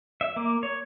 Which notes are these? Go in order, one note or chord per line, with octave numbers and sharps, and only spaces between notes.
E5
A#3 D6
C#5